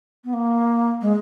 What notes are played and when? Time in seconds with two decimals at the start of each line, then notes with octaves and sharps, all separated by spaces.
0.24 B3
0.33 A#3
1.01 G#3